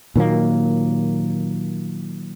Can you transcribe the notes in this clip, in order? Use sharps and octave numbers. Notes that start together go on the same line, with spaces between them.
A#2 D#3 F#3 A#3